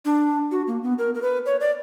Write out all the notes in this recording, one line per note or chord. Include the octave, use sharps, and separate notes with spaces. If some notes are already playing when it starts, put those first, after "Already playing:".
D4
F#4
A#3
B3
A#4
A#4
B4
C#5
D5